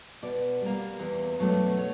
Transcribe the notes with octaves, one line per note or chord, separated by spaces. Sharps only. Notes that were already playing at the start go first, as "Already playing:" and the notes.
B2 D5
G3 A#3
E2
B2 F#3 A3 D4
C#5